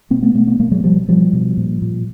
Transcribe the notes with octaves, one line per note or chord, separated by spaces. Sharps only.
B2 A#3 C4
A3 B3
B2 A3 B3
A3 B3
B2 G#3 A#3
F#3 G#3
B2 F3 G3
B2 F3 G3
B2
A#2
A#2